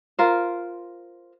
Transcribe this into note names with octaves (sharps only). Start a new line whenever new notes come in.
F4 A#4 C5